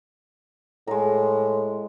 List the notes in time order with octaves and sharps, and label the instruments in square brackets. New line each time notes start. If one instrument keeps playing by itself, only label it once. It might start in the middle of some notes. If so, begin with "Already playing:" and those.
[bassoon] A2 [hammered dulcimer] G#3 A#5